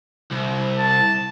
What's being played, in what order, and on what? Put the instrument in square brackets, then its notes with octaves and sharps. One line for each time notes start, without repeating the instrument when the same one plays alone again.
[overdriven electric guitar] C2
[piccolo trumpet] A5